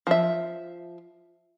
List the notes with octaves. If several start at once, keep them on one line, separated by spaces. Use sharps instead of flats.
F3 E5